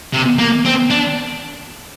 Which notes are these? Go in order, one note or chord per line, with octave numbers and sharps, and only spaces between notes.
C3
A#3
C4
D4